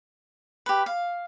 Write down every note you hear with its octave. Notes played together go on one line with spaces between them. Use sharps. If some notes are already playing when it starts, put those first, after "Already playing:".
G4 B4
F5